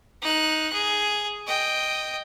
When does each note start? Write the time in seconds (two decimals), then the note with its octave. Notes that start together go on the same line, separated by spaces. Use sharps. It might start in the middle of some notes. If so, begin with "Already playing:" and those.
0.22 D#4 F#6
0.73 G#4
1.47 D#5 G5